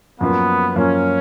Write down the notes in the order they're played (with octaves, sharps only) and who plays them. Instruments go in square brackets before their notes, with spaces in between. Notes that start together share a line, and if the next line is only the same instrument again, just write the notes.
[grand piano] F#2 F3 A#3 [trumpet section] B3
[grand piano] F#2 F3 A#3 [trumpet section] C#4